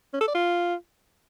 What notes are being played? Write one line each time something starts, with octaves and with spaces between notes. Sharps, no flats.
C#4
A4
D5
F4